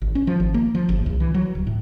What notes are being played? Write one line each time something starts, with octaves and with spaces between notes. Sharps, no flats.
G#1
C#4
F3
G#1
A#3
F3
G1
C2
E3
F#3
D1
A2